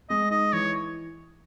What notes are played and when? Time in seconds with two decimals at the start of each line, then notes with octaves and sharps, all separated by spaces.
0.10 G#3 D#5
0.31 D#4 D#5
0.53 E3 C#5